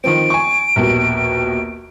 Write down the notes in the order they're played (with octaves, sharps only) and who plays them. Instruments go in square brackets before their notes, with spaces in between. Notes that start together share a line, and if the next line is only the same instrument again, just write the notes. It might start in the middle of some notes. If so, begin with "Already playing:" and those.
[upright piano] D#3 F3 C4 [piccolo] D7
[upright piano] G#5 C#6
A#1 D#2 B2